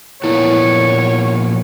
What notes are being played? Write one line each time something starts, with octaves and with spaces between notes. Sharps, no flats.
A#2 F3 B3 E4 C#5